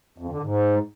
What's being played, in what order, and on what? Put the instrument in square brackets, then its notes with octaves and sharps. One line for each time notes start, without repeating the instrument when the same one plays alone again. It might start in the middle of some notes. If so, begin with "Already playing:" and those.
[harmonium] F2
D3
G#2